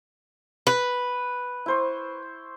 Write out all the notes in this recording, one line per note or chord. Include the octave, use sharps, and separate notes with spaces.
B4
E4 C5 C#6